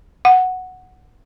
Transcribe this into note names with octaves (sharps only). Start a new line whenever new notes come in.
F#5